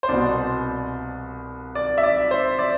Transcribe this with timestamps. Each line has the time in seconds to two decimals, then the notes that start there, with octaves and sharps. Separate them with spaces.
0.03 C5
0.08 C2 B2 D5
1.75 D5
1.98 E5
2.03 D5
2.31 C5
2.59 D5